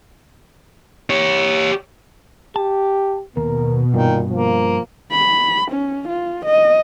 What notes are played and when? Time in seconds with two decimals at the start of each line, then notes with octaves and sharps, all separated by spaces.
1.10 G4 C#5
2.56 G4 A5
3.37 D#2 B2 A#4
3.94 G2 A#2 D#3
4.31 F3 A#3
5.12 B5
5.71 C#4
6.08 F4
6.45 D#5